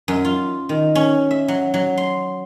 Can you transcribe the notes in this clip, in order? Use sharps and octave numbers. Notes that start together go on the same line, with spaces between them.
F#2
F4
D#3
C#4
E5
F#3
F#3
C6